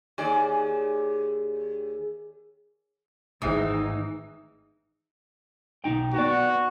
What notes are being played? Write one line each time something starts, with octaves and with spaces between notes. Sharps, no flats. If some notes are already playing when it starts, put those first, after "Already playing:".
D#2 G#4 D5
G#1 A2 E3 D#4 G#4 E5 D#6
B1 D#4 G5
B3 F#4 D5